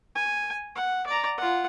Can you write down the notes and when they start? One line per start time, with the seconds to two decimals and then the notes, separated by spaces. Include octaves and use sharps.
0.15 G#5
0.75 F#5
1.07 D5 A#5
1.38 F4 F#5